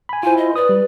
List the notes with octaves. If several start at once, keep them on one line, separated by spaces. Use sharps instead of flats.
G#5 B5
E4 F4 C5 G#5
D#5
B4 D5 D#6
G3